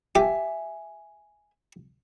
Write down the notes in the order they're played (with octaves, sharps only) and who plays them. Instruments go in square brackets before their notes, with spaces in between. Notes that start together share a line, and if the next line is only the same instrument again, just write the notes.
[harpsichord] G4 [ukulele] E5 G#5